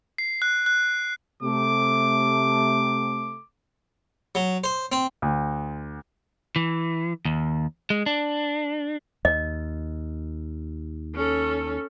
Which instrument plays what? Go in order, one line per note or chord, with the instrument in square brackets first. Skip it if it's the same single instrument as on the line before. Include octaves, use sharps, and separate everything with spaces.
[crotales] C7
F#6
F#6
[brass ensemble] C3 A3 [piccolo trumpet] D6
[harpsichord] F#3
C5
C4
[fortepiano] D2
[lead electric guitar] E3
D#2
G#3
D4
[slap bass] D#2 [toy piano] D#5
[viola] C#4 A4